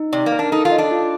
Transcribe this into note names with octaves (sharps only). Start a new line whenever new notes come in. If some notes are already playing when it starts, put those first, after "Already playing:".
Already playing: D#4
C3 D5
A#3
A#4
D4
D#4 A4
F4
D#5
D4
F4